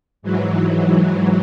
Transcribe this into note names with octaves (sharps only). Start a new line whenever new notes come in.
G#2 E3 F#3